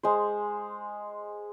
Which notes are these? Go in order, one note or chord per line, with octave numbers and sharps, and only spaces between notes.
G#3 C5